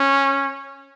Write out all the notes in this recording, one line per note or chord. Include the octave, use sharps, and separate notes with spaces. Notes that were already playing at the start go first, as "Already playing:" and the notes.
Already playing: C#4